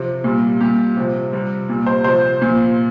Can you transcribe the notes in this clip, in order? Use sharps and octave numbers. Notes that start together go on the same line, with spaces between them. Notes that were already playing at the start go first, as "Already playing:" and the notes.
Already playing: C3 F3
A#2 G3
A#2 G3 G4
C3 F3
C3 G3
A#2 G3
C5
C3 F3 C5
A#2 F3